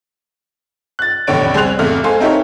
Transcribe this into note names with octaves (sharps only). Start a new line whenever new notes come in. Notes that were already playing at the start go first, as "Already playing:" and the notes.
F#6 A6
F1 E2 A2 D3 C#5 D7
C2 G#4 C5 C6 F#6 F7
G#1 E2 C3 A3 F6
G#3 A4 C5 F5 G#5 C6
C4 D#4 E4 G4 A#4 C#5